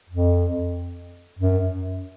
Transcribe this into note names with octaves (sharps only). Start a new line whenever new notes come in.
F2
F#2